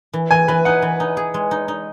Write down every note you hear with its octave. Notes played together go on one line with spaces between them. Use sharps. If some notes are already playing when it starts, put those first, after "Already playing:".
E3
E3 G#5
E3 B4
D#4 F#5
E3
D#4
G#4
G#3
D#4
D#4